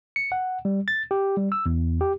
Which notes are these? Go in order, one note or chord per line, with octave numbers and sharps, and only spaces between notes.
C#7
F#5
G3
A6
G4
G3
E6
E2
G4